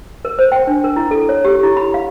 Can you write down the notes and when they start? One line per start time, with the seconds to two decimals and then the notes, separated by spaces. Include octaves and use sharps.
0.25 A#4
0.39 C5
0.52 G5
0.67 D4
0.84 A#4
0.96 E4
1.11 A4
1.29 C#5
1.45 G4
1.63 E4
1.77 B5
1.94 F5